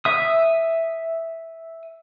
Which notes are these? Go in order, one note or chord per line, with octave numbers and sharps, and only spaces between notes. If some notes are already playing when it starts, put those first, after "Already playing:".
E5 D#6